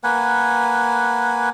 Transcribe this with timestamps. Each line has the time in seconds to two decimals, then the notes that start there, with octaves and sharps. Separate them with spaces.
0.04 A#3 B4 F#5 G#5